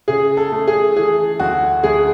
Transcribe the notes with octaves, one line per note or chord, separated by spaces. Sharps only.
C#3 G#4
A4
A3
G#4
E3 G#4
D2 F#4
D2 G#4